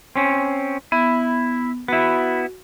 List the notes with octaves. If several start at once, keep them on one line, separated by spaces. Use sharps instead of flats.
C4 C#4
B3 E4
B3 E4 F#4